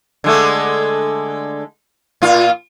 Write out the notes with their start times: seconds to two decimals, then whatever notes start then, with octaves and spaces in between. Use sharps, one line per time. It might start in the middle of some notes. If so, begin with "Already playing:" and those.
0.24 D3 G#3 A3
2.22 A#2 F4